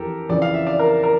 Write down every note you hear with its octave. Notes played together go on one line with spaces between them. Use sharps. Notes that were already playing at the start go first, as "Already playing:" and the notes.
Already playing: F2 E3 G4 A4 A#4
F2 C#3 E3 D5
F5
E5
D5
A#4
A#4